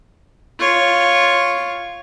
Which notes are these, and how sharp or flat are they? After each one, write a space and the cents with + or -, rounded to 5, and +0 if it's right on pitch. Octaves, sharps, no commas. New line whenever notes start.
F4 +0 C#5 +0